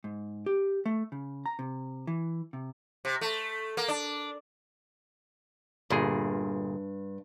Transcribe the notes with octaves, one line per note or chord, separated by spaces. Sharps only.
G#2
G4
A3
C#3
A#5
C3
E3
C3
C3
A3
A#3
D4
G1 G2 A#2 G#4